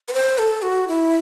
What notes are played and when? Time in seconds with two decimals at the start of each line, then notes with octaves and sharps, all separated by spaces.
0.08 B4
0.13 C5
0.38 A4
0.62 F#4
0.88 E4